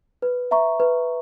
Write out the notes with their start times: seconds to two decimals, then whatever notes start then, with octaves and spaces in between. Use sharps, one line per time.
0.22 B4
0.51 E5 A#5 C#6
0.80 B4